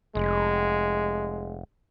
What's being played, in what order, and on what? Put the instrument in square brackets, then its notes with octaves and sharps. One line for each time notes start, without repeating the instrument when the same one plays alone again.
[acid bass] F1 [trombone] G#3